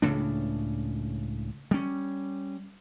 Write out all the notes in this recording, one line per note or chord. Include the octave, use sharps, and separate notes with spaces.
C#2 A2 C#3 D4
G3 C#4